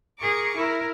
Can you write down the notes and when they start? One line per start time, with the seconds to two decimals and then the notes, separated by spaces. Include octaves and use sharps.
0.18 G#4 A#4 C#6 D6
0.55 E4 A#4